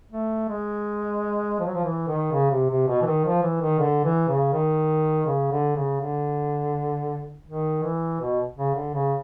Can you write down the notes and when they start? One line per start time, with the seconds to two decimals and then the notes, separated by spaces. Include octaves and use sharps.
0.12 A3
0.49 G#3
1.60 F3
1.67 F#3
1.74 F3
1.84 E3
2.07 D#3
2.32 C#3
2.51 C3
2.69 C3
2.87 B2
3.01 E3
3.06 D#3
3.25 F3
3.43 E3
3.61 D#3
3.79 D3
4.04 E3
4.28 C#3
4.53 D#3
5.27 C#3
5.51 D3
5.76 C#3
6.00 D3
7.47 D#3
7.83 E3
8.20 B2
8.56 C#3
8.75 D3
8.94 C#3